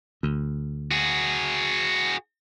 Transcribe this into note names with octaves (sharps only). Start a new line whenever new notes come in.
D2
F#4 G#4